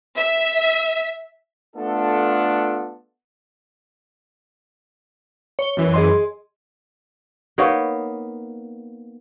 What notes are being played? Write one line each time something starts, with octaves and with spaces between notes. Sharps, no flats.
E5
A3 B3 D4 F4 A4
C#5 G7
F#2 E3
G#4 D#5 C6
A#3 B3 D#4 C#5